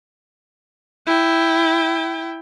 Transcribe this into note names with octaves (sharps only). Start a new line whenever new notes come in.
E4 G5